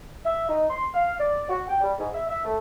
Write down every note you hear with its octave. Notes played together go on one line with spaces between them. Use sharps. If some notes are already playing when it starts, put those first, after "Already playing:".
E5
D#4
C6
F5
D5
F#4
G5
G3
G#2
E5
E5
A3